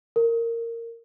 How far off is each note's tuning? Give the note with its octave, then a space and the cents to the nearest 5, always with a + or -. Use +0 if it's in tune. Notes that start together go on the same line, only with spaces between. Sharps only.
A#4 -15